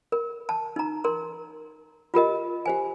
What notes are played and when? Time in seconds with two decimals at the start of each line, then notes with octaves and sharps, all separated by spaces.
0.12 A#4
0.49 A5
0.76 D#4 A#5
1.04 A#4 C6
2.14 F4 G4 A#4 D#5
2.66 G4 C5 G#5